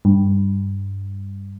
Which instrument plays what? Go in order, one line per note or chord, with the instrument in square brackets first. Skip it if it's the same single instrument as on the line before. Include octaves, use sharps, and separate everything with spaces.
[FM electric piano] G2